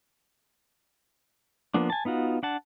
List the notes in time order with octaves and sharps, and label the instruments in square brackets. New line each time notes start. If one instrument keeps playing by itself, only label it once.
[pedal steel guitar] F3 A#3 B3 D4
G#5 A5
B3 D#4 F4 F#4
D4 F#5 A5